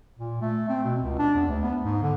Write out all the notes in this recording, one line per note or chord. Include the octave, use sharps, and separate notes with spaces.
A#2
A3
C4
B2
C#2
D4
E2
D2
B3
G#2
D3